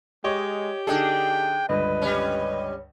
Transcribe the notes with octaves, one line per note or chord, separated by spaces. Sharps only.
G#3 G4 C#5 D#5
D3 D4 D#4 G#4 A4 G5
C#2 G2 D3 B4 D#5
G3 C#4